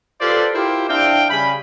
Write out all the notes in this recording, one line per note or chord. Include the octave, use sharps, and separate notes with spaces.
F4 G4 A4 B4 C5 D5
E4 F4 G4 A#4 C5
C4 D4 E4 F5 G5
C#3 G3 G#5 B5